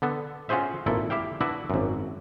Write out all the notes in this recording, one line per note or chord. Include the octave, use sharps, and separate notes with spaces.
D3 B3 A4
C#4 F4 F#4 G#4 C5 E5
G#1 A#2 E4 A4
E4 G4 E5 F5 G5
D4 E4 F#4 B4 E5
G#1 F#2